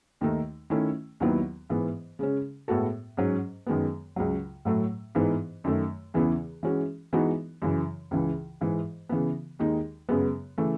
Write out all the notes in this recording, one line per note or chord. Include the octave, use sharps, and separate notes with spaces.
D#2 D#3 A3 D#4
D#3 A3 C#4 E4
D#2 D#3 F#3 B3 E4
G#2 E3 B3
C#3 G#3 C#4
A2 G#3 B3 F#4 A4
G#2 F#3 C#4
F#2 D#3 G#3 B3
C#2 C#3 F#3
A2 F#3 A3
G#2 E3 B3 D#4
F#2 D#3 A3
E2 C#3 E3 B3 E4
E3 G#3 C#4 F#4
E3 G#3 B3 D#4 F#4
F#2 C#3 E3
C#2 C#3 E3
G#2 E3 G#3
C#3 E3 B3
D#2 D#3 G#3 D#4
F#2 C#3 G#3 B3
C#3 E3 A3